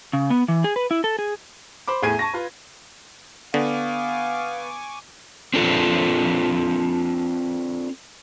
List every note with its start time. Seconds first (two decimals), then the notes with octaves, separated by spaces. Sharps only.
0.13 C#3
0.30 B3
0.48 E3
0.64 G#4
0.76 B4
0.91 E4
1.04 A4
1.19 G#4
1.88 C5 B5 D6
2.02 E2 A2 G#4 G#6 D#7
2.19 A5 C#6 A#6
2.34 F4 B4
3.54 D3 B3 F5 G#5 C#6 D6
5.54 C4 D4 F4 A4